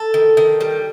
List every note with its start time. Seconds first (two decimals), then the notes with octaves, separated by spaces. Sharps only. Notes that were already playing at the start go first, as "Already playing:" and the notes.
Already playing: A4
0.14 D#3
0.37 D#3
0.61 G3